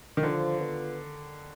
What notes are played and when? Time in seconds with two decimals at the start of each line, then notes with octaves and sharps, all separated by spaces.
0.17 D#3
0.23 D3 F3
0.61 B3 F4